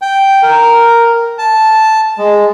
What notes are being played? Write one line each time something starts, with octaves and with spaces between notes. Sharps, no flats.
G5
A#4
A5
G#3